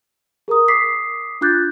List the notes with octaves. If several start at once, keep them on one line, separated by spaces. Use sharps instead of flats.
G#4 A#4 A#5 D#6
D6 D#6 B6 C7
D4 F4 D6 F#6 G6 A6